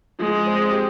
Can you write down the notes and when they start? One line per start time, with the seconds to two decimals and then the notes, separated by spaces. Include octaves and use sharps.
0.19 F3 G#3
0.46 C4
0.71 G4